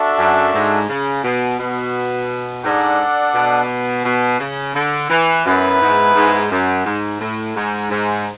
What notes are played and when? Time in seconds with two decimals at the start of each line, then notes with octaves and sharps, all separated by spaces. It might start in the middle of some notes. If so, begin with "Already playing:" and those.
Already playing: D4 F#4 A4 E5
0.18 F#2
0.54 G#2
0.89 C#3
1.24 B2
1.60 B2
2.64 G#2 D4 A4 D5 F#5
3.34 B2
4.05 B2
4.40 C#3
4.74 D3
5.10 E3
5.46 F#2 B3 E4 B4
5.81 G#2
6.15 G#2
6.51 F#2
6.86 G#2
7.21 A2
7.56 G#2
7.91 G#2